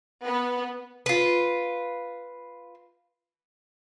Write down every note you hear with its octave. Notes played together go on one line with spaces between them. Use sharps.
B3
F4 B4